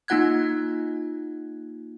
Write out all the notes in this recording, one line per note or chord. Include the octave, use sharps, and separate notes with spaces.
A#3 D#4 F4 F#5 F#6 G#6